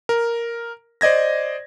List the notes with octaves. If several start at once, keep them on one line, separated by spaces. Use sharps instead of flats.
A#4
C5 D5 D#5 G#6 A#6